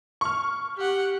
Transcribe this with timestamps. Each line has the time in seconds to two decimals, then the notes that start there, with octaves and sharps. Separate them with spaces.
0.21 C#6 F6
0.77 G4 F#5